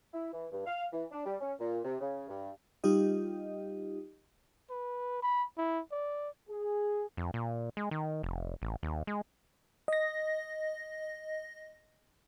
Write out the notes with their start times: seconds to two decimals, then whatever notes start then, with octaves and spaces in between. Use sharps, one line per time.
0.13 E4
0.33 E3
0.52 G2
0.66 F5
0.93 E3
1.11 D4
1.25 G3
1.41 C#4
1.59 A#2
1.84 C3
2.00 C#3
2.28 G2
2.84 G3 D#4 F4 G4 D#5
4.70 B4
5.23 B5
5.58 E4
5.92 D5
6.49 G#4
7.17 F2
7.34 A#2
7.77 G#3
7.91 D#3
8.23 F1
8.62 A1
8.83 D#2
9.07 G#3
9.88 D#5 A#6